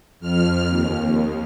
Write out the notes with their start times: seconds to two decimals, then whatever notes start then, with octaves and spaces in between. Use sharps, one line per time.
0.20 F2 F6
0.67 D#2